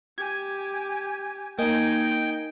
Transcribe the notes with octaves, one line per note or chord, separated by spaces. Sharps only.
G4 G#5 G#6
A#3 D#4 D#5 G5 G#5